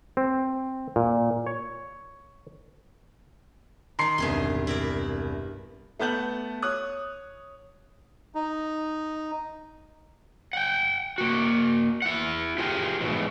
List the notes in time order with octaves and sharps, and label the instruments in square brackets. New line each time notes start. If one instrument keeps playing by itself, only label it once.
[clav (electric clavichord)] C4
A#2
C#5
[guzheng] D#3 D#4 [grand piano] A#5 C6 C7
[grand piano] E1 C2 [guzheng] G2 G#4 C6
[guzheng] E4 A#4 D5
[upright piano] A3 B3 A5 G6 F#7
C#5 D#6 F#6
[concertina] D#4
[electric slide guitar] F#5 G5
A#3 F#4
E4 F#5
F4 G4 G#4 A#4
G#2 B2 E3 G#3